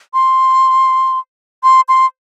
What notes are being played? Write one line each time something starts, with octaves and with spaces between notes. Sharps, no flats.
C6
C6
C6